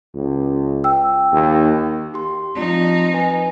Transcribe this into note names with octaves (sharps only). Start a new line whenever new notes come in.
C#2
G5 E6
D#2
G4 C6
F3 C4 D#4 F4
B4 G#5